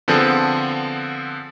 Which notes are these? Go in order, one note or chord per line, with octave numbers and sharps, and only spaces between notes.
D3 F3 B3 C4 G#4 A4